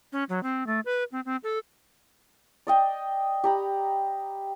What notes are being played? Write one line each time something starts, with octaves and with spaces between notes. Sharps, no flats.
C#4
F#3
C4
A3
B4
C4
C4
A4
D5 D#5 G5
G4 A#5 B5